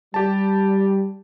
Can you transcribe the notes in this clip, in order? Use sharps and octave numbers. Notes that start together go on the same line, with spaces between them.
G3 G4 A5